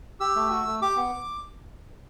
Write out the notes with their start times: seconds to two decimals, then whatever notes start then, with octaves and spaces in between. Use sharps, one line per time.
0.20 G4 E6
0.36 A3
0.50 F#4
0.66 A3
0.82 G4 D6
0.96 B3